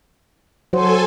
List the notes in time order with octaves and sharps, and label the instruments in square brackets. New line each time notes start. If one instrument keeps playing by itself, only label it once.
[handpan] F#3 F#4 C5 [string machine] A4 G#5